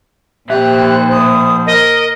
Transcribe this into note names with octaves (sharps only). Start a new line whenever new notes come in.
A#2 F3 G4 C5 E5 F#6
D#6
A#4 D#5